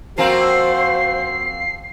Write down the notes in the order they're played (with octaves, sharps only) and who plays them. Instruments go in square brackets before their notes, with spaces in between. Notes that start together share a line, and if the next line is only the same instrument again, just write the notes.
[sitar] F3 A#3 C4 [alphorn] F#4 [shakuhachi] C5 [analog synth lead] C7